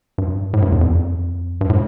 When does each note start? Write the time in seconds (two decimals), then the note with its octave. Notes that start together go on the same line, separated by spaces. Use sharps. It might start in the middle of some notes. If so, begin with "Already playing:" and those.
0.18 G2
0.53 A2
0.62 G2
0.72 E2
0.81 F2
1.61 G2
1.70 A2